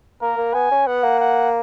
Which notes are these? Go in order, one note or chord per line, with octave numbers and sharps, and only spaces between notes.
A#3 A#4
A#3
B3 G#5
C#4
B3 F#5
A#3
F#5